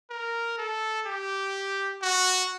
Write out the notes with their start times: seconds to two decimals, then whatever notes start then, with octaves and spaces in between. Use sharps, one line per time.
0.10 A#4
0.58 A4
1.06 G4
2.02 F#4